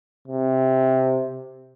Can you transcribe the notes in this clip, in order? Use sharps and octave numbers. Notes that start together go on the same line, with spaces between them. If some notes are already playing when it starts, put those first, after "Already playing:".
C3